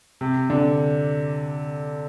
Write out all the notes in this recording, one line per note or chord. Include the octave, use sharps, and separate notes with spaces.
C3
D3